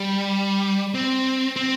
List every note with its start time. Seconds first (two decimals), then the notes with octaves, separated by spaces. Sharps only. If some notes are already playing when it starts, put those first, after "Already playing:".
Already playing: G3
0.94 C4
1.56 C4